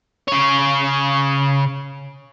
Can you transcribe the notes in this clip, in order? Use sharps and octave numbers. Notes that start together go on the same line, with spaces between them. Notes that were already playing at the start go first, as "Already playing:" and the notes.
C#3 C#5